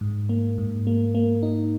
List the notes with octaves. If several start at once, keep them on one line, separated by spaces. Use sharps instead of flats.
G#2
A#3
G#2
A#3
A#3
D#4